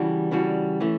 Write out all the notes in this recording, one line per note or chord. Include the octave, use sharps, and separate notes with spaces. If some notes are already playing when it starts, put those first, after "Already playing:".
Already playing: C#3 E3 G3 D4 F#4
C#3 E3 G3 D4 F#4
E3 A3 C#4